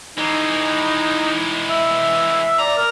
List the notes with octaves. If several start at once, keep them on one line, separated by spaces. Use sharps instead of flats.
E3 G#3 D#4
E5
D5 A#5
A#4